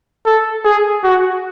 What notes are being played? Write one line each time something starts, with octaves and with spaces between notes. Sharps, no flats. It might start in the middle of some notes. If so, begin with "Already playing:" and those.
A4
G#4
F#4